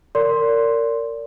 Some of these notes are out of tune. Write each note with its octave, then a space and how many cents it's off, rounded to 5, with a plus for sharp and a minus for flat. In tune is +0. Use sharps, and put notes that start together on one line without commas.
A#4 -25 D5 -30 C6 +0